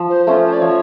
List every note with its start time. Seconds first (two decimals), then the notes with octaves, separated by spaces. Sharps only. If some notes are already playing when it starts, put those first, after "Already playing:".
Already playing: F3
0.10 C5
0.27 A3 C#4 F4 C5
0.44 C5
0.53 D5
0.62 F3 C#5